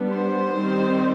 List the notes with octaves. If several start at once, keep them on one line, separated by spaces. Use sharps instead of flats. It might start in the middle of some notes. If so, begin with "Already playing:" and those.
Already playing: G3 B3 D4
C5
D#3 G3 C4